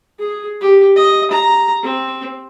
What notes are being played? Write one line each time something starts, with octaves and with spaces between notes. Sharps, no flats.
G#4
G4
D#5
A#5
C4